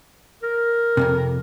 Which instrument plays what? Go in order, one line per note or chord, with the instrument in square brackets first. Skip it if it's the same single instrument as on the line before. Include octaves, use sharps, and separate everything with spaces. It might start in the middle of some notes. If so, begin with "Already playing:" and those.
[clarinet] A#4
[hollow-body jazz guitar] F2 G#2 C3